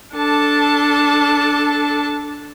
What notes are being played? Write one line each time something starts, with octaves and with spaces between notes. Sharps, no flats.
D4 A4 A5